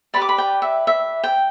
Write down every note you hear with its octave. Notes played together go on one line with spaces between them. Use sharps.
G4 B4 D5 B5
D6
B5
G5
E5
E5
G5